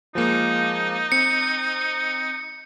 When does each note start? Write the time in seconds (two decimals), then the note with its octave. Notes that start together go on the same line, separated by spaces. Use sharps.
0.15 F3 G#3 A#3 D#4
1.12 C4 C#7